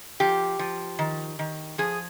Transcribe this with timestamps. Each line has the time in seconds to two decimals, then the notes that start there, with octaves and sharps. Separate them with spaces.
0.20 F3 G4
0.59 F3
0.99 D#3
1.39 D#3
1.78 F3 G#4